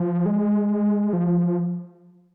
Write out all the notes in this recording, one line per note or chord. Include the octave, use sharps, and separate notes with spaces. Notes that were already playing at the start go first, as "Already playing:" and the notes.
Already playing: F3
G#3
F3